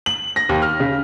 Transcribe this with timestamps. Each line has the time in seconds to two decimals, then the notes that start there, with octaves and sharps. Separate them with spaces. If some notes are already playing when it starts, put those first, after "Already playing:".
0.06 F#7
0.36 A#6
0.49 D#2
0.62 F6
0.80 C#3